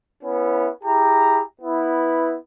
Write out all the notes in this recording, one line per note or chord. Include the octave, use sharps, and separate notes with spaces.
B3 C#4 E4
E4 G4 G#4 A#5
B3 E4